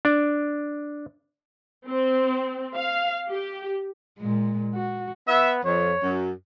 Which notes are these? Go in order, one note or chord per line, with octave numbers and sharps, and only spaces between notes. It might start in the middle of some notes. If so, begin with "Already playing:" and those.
D4 D5
C4
F5
G4
A#2 G#3
F#4
B3 E5
F2 C#5
F#2 F#3